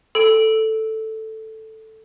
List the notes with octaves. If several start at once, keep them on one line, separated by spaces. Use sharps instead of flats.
A4 D7